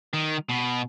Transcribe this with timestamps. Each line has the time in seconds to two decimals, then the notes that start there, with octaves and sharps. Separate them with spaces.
0.14 D#3
0.49 B2